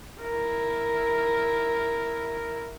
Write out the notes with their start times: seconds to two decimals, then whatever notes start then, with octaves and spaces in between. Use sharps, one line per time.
0.20 E4 A#4